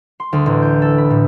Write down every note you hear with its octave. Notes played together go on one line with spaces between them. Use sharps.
C6
D2
A1
G6
A4
B5
A2